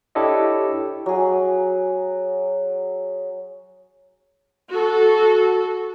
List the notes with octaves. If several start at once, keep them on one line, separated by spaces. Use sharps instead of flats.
D4 E4 G4 A4 C#5 D#5
F#3 G#4
F#4 A4